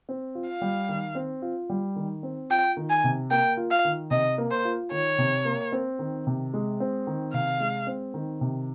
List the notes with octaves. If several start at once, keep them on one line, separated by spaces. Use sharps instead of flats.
C4
F4
F5
G3
D#3
C4
F4
G3
D#3
C4
F4 G5
D#3
G#5
C3
A#3 G5
F4
F5
D#3
C3 D#5
A#3
C5
F4
D#3 C#5
C3
A#3
C4
D#3
C3
G#3
C4
D#3
C3 F5
G#3
C4
D#3
C3